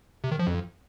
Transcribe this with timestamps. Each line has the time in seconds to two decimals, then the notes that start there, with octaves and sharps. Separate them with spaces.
0.24 C3
0.32 D#3
0.39 F3
0.47 F2